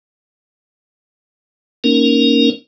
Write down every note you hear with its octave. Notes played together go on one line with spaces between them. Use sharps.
A#3 C#4 D#4 A#4